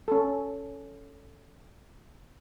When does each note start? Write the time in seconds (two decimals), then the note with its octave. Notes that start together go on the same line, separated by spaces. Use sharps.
0.08 C#4 A4